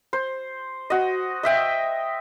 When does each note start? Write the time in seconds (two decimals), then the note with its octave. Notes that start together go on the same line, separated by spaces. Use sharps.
0.13 C5
0.90 F#4 D#5
1.43 D#5 E5 G5